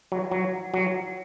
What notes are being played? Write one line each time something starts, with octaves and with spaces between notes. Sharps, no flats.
F#3
F#3
F#3